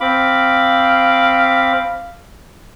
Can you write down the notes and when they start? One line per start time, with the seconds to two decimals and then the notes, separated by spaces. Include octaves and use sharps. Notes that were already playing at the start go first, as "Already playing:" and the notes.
0.01 C4 F5 B5 D6